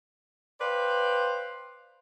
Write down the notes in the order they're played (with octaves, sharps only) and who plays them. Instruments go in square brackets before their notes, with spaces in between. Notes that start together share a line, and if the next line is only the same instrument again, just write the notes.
[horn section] B4 C5 D5 F5 G5